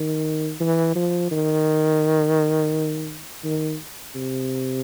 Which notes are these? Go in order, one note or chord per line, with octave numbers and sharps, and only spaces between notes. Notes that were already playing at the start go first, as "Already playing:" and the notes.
Already playing: D#3
E3
F3
D#3
D#3
C3